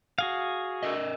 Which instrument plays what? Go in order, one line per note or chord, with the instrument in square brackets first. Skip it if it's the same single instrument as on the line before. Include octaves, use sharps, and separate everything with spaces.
[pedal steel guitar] F#4 G#4 F5
[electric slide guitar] A4 A#4 D#5